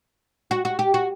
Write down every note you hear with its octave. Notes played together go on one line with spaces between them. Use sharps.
F#4
F#4
G4
F#4